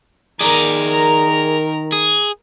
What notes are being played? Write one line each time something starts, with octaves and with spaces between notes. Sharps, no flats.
D#3 G#4 A#4 D5 A#5
G#4